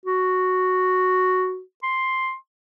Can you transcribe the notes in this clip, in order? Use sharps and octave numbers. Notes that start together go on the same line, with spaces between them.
F#4
C6